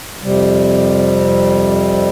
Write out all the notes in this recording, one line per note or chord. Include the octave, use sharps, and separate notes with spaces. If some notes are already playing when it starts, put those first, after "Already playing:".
F2 C3 G3